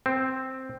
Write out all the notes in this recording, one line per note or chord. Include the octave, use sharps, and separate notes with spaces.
C4